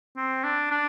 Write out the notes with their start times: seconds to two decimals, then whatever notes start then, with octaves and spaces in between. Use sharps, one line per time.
0.17 C4
0.44 D4
0.71 D4